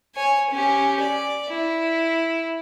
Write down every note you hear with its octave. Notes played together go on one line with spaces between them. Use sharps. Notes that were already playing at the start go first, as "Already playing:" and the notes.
C#5 G#5
C#4 G4
D5
E4